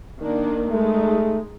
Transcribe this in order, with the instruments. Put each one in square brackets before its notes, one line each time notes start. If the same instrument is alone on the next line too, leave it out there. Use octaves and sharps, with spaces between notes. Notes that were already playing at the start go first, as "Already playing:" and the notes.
[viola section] D#3 A#3 D4
[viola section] G#3 D#4 [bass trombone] A3